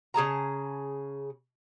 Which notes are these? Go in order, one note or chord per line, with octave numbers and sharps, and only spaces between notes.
C#3 G#4 A5 A#5